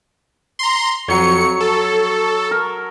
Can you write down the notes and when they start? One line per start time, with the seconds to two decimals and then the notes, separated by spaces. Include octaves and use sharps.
0.59 A#5 C6
1.08 F2 F#3 C#5 C#7
1.60 A4
2.51 A#4